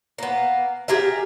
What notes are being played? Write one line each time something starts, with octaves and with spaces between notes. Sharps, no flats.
A#3 B3
G4 G#4 A#4 E5